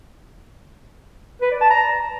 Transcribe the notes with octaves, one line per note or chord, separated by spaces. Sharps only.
B4
D5
A5
A#5